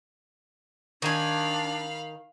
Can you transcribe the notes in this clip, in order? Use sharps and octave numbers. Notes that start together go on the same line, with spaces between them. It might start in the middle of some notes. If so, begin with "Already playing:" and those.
D#3 D4 F5 G#5 B5